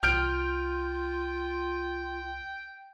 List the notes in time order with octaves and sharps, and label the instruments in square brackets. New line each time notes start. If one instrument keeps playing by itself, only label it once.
[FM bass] C2 [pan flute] F4 [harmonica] G5 [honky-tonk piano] F6 G6 D7